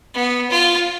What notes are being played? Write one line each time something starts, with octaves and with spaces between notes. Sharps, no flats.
B3
F4